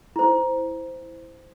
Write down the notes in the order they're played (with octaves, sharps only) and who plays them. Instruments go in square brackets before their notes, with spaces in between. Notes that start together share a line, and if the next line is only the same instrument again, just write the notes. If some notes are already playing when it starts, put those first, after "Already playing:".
[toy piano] E4 C5